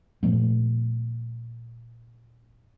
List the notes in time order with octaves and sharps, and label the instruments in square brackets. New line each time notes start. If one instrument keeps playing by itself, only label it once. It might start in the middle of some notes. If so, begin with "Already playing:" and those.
[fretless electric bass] A#2 F3 A3 B3